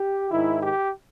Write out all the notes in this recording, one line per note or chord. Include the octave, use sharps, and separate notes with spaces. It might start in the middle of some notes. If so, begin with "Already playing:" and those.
Already playing: G4
G#2 D#3 E4
G4